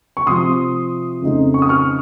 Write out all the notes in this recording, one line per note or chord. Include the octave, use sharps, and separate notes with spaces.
C#6
C3 F3 C4 C6 D#6
F2 C#3 A3 C4 D#4
C#6
D#6
C#6 F6